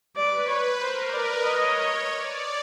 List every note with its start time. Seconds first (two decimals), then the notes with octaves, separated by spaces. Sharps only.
0.16 B4 D5
0.48 B4 C#5
0.80 A#4 C5
1.11 B4 D5
1.43 C#5 D#5
2.07 D5